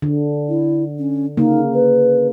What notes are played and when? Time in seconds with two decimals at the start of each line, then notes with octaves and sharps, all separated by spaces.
0.02 D3
0.48 E4
0.98 C#4
1.37 C#3 A#3 D#4
1.74 B4